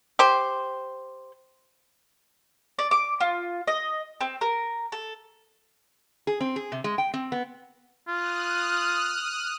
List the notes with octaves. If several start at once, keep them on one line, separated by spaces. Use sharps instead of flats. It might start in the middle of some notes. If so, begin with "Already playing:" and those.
G4 C5
D5
D6
F4
D#5
C4
A#4
A4
G#4
C4
G#4
C3
G#3
G5
C4
B3
F4 D#6 F6 F#6